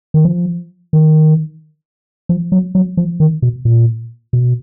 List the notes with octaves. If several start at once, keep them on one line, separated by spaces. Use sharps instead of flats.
D#3
F3
D#3
F3
F#3
F#3
F3
D#3
B2
A#2
B2